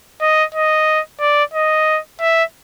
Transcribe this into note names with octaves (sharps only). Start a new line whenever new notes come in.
D#5
D#5
D5
D#5
E5